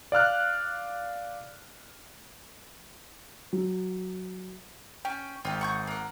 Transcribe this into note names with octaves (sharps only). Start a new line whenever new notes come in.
D5 F5 F6 F#6
F#3
C#4 G5
G#1 F4 G4
F#5 C#6 G6
A#3 F#5